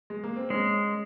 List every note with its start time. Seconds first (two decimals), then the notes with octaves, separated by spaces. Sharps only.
0.10 G#3
0.23 A#3
0.36 C4
0.50 G#3 C#4